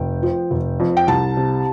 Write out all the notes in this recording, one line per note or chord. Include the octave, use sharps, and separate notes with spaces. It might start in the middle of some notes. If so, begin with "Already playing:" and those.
Already playing: F1 G5
F3
F1
F2
G5
C2 A5
C3